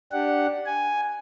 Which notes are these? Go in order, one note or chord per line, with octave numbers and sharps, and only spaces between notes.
D4 G4 F#5
G#5